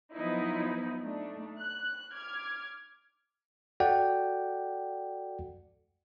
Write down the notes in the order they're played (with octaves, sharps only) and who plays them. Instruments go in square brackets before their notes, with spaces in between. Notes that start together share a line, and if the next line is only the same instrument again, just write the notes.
[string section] F3 F#3 B3 D#4 E4
A3 D4 D#4
F#6
D6 F6 G#6
[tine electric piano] F#4 A4 D5 F#5 G5